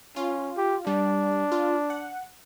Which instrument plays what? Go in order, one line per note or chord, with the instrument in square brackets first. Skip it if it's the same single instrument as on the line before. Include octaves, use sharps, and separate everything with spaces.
[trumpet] C#4 [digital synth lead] F4
[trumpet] G4
[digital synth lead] G3 [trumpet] D4
[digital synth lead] F4
F#5